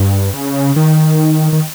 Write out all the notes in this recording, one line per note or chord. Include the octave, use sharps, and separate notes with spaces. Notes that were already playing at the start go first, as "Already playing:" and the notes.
Already playing: G2
C#3
D#3
D#3